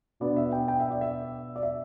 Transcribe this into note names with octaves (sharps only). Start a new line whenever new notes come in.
B2 B3 D4 D5
E5
G5
G5
E5
D5
E5
D5
E5